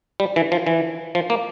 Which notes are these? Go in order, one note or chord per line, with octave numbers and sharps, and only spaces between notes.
G3
E3
F3
E3
F3
A#3